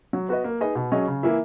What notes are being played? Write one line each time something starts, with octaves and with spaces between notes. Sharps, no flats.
F#3
B3 F#4 B4 D#5
A#3
D#4 G#4 B4 D#5
B2
F#3 C#4 G#4 D#5
C#3
E3 A#3 E4